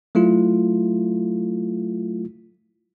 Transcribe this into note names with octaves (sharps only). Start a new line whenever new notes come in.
F#3 A3 E4 F4